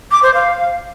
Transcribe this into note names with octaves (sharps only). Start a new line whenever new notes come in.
D6
C5
F5